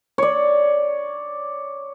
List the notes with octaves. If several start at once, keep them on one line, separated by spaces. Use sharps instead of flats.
C#5 D5